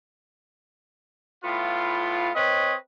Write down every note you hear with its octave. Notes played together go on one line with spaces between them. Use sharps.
A2 B3 F4
C4 B4 C#5 D#5